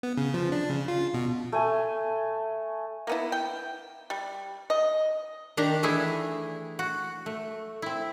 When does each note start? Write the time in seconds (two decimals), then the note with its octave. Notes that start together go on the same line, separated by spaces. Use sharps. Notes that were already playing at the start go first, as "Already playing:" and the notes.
0.03 B3
0.17 C#3
0.34 F3
0.52 D4
0.70 C#3
0.88 F4
1.14 B2
1.52 A3 G#5
3.07 A#3 B3 E4
3.32 G5
4.10 G3
4.70 D#5
5.57 D#3 D4 G4 A#5
5.83 E3 A3 D4 E4 G#4
6.79 F#4
7.26 A3
7.82 C4 E4